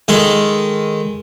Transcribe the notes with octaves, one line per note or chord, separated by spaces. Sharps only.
D#3 G#3 A4